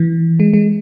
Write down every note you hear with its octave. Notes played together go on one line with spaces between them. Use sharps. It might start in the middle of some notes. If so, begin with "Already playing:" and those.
Already playing: E3
G#3
G#3